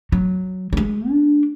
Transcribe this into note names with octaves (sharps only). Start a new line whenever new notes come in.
F#3
F#3
G#3
D4